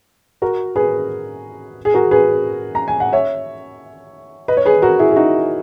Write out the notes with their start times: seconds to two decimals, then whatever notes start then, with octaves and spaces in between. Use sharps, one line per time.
0.42 F#4 A#4
0.76 G#4 B4
1.85 G#4
1.94 F#4 A#4
2.11 G#4 B4
2.75 A#5
2.88 G#5
3.00 F#5
3.13 C#5 E5
4.48 B4 D#5
4.57 C#5
4.65 G#4 B4
4.82 F#4 A#4
4.99 E4 G#4
5.12 G#4
5.16 D#4 F#4